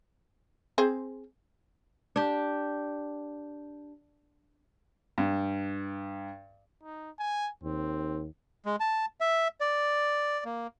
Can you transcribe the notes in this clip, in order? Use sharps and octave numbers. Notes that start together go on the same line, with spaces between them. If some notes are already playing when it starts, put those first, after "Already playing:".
C4 G#4 C5
D4 G4
G2
D#4
G#5
D#2 C4
G#3
A5
E5
D5
A#3